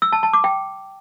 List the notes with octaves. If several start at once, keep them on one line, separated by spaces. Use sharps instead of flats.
E6
A5
A5
D6
G5